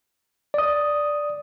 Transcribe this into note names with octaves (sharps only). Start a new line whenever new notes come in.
D5 D#6